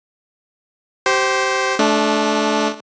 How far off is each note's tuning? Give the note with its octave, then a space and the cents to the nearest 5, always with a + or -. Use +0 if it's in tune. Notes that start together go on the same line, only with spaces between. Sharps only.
G4 -25 C5 +0
A3 -25 D4 -5